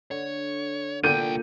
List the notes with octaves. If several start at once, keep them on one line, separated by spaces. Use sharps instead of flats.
D3 C#5
C2 A#2 D3 G5 G6 D#7